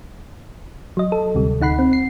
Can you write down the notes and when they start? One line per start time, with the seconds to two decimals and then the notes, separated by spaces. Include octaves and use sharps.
0.97 F#3 D#5
1.12 A4
1.35 D2 C3 G3
1.61 D2 D#4 F#5 B5 C7
1.79 C4
1.93 C7